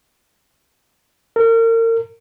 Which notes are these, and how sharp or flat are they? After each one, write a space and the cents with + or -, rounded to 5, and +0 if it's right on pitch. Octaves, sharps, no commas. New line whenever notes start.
A#4 -35